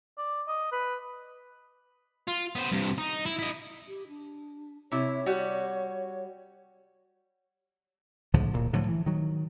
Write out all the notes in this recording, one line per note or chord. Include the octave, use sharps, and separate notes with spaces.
D5
D#5
B4
F4
B3 C5
G2 C3
D#4
E4
E4 D#5
G4
D4
C3 E4 C#5
G3 F#4
C#2 A2 D3 F3
D1 A#2
A2 D3 F3 F#3
E3
D#3 F#3